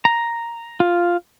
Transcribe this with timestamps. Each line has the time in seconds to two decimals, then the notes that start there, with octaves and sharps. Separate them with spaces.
0.05 A#5
0.80 F4